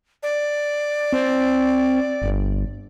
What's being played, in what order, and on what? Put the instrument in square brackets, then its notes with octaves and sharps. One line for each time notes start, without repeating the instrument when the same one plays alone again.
[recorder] D5
[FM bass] C4
G1